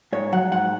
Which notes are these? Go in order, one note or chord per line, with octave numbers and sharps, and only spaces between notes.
G#2 C#5
F#3 F#5
G#2 F#5